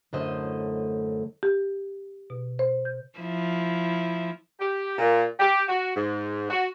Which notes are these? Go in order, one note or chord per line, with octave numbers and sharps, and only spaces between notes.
F#2 A2 D3 A3 C5 D#5
G4
B2
C5
G6
F3 E4
G4
A#2
G4
F#4
G#2
F#4